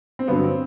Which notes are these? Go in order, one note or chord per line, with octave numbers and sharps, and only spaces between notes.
C4
G2 D3 F#3 B3
C4